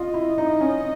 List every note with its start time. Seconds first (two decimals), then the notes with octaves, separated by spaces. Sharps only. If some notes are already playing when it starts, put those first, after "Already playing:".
Already playing: F4 D#5
0.14 E4
0.38 D#4
0.61 C#4